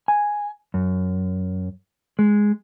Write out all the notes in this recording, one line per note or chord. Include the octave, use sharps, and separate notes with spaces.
G#5
F#2
G#3